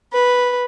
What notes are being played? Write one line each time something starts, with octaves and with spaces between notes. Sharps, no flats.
B4